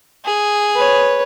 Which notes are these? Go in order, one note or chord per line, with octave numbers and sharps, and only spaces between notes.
G#4
B4 C#5